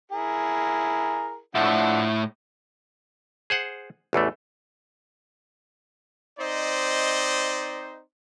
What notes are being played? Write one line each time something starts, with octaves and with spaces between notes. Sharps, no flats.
E4 G#4 A#4
A2 F3 D4 E4 F#5
G#4 C5 F#5
A1 E2 E3 A3
C4 D#4 C5 D5 D#5